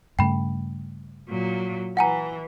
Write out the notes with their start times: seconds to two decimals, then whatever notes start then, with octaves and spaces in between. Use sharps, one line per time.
0.19 G2 C#3 A3 G5 B5
1.29 A#2 F#3
1.97 E3 F#5 G#5 A#5